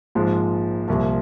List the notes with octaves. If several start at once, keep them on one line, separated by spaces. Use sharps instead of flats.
A#1 G#2 F3 G#3
C2 A#2 F3